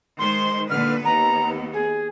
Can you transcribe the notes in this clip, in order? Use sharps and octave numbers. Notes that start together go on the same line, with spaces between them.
D#3 G#3 C5 C6
A#2 D3 B4 F6
D#2 B3 A#5
G#4